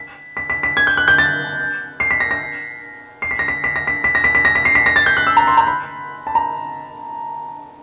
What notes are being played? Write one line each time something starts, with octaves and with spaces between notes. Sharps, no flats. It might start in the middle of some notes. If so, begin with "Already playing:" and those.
Already playing: B6
B6
B6
B6
G#6
G6
F#6
G6
A6
C7
B6
A#6
A#6
C7
B6
A#6
B6
B6
A#6
B6
B6
A#6
B6
B6
A#6
B6
C7
B6
A#6
A6
G6
F#6
E6
A#5
C6
A#5
B5
A5
A#5